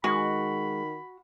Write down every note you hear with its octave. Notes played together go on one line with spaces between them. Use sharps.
D#3 G#3 F#4 B5